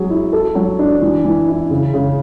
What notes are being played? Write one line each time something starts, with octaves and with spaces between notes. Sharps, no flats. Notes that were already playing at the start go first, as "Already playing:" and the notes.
Already playing: F#3 G#4
E4
A4
F#3
D4
E3
E3
E4
C#3
C#3